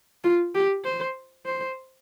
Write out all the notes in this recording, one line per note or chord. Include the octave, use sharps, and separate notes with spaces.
F4
G4
C5
C5